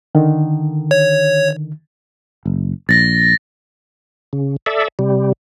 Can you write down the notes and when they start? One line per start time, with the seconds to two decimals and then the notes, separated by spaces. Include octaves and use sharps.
0.15 D3 D#3
0.91 C#5
2.46 F#1
2.89 A#1 A6 A#6
4.33 C#3
4.66 A4 D5 E5
4.99 C3 G3